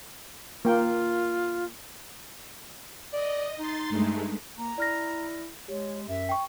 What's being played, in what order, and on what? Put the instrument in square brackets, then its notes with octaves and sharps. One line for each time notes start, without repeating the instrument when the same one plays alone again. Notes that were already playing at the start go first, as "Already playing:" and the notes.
[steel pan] A#3 G5 [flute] F4
[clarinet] D5 [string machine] D#5
[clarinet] D#4 [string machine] C6 A6
[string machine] G2 G#3 A3
[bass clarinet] A#3 [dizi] A#5
[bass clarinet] E4 [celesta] D5 F6 A#6
[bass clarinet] G#3 [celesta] G4 [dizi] C#5
[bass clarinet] F#2 [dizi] E5
[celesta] G5 C#6